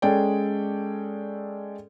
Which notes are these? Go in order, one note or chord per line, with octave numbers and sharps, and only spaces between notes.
G#3 C#4 G#4 A4 D5 G5